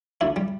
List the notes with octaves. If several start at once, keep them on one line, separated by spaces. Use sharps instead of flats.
D2 E4
G3